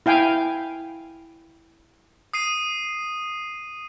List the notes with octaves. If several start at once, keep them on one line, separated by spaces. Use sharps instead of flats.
E4 F5 G5 G#5
D#6 C7 D#7